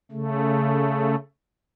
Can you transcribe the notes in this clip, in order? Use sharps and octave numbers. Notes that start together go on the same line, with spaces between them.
C#3 A3